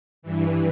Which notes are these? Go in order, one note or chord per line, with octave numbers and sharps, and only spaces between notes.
G2 E3